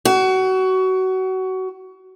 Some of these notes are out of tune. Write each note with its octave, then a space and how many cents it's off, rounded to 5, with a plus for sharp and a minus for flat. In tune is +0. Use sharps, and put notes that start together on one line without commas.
F#4 +25